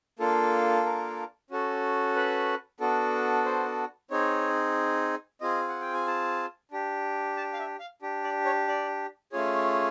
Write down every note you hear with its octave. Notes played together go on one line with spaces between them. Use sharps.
A#3 D4 F4 A4
A#4
C#4 F#4 A4
B4
B3 D4 F#4 A4
C5
C4 D#4 G#4 C#5
C4 F4 G#4 D#5
F#5
G5
G#5
A5
D4 G4
A5
F5
E5
F5
D4 G4
D5
C#5
D5
A3 C#4 F4 G#4 C#5